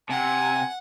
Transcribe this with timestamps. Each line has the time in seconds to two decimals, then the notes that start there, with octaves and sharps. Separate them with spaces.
0.10 C3 F#5 G#5